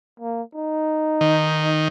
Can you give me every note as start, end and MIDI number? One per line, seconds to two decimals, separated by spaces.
0.20 0.42 58
0.55 1.70 63
1.21 1.88 51